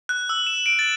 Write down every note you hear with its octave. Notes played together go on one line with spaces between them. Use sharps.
F#6
E6
E7
D7
A6